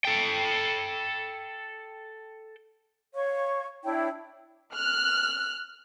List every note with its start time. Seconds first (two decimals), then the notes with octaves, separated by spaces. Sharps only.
0.05 A4 G5
3.14 C#5 F5 C#6
3.83 D4 E4 C#5 G5
4.71 F6 F#6